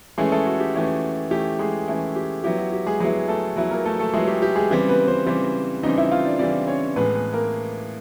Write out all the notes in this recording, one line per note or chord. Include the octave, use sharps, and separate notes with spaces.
E3 G#3 A3 C#4 E4 G#4
A3 A4
F#4
G4
E3 A3 C#4 E4
E3 A3 C#4 E4 G4
G#3 G#4
E3 A3 C#4 E4
G4
F#3 B3 E4 G4
F#4
G4
G#3 G#4
F#3 G#3 B3 E4 G#4
A3 A4
F#3 B3 E4 B4
A#3 A#4
A3 A4
A3 A4
F#3 G#3 B3 E4 G#4
G4
G4
G#3 G#4
C#3 E3 G3 C4
B3 B4
C4 C5
C#3 E3 G3 C4
C#3 E3 G3 C4 D#4 D#5
E4 E5
F4 F5
D4 D5
C#3 E3 G3 C4 D4 D5
C#4 C#5
A2 E3 G#3 B3 B4
B3 B4
A#3 A#4